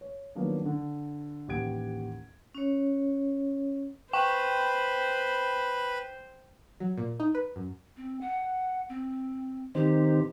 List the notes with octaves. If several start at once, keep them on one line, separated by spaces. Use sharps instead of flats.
C#5
D#3 F3 F#3 A#3 B3 D4
D3
A1 D#2 G4 F#5 G#6 D7
C#4 C#5
B4 C5 G5 B5
F#3
A#2
D#4
B4
F#2
C4
F#5
C4
D#3 C4 G4